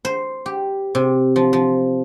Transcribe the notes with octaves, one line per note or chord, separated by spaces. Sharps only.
C5
G4
C3
F3
F3